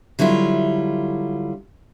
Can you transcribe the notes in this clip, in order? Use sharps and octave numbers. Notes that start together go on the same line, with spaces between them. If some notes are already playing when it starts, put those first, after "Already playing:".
D3 F#3 G3 E4 F4